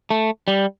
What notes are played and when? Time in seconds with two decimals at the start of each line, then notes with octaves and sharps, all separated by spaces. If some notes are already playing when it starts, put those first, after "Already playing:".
0.11 A3
0.48 G3